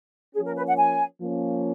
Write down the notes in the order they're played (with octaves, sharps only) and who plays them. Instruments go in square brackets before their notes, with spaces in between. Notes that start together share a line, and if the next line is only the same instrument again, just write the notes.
[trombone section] F3 A#3 C#4 [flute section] G#4
[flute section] A#4
B4
F#5
G#5
[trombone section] F3 A#3 C#4